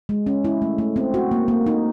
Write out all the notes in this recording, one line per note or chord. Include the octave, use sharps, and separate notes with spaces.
G#3
C#4
E4
A3
A3
C4
F#4
A#3
A#3
D#4